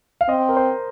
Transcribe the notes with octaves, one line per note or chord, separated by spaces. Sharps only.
F5
C4 D#5
A#4
C5